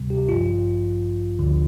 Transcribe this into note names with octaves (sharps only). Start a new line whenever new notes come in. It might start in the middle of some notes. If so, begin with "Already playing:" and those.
Already playing: D2 C3 G3
G4
A1 G2 F3 F4
D2 D3 F3